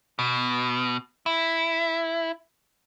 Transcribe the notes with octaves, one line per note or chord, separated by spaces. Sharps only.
B2
E4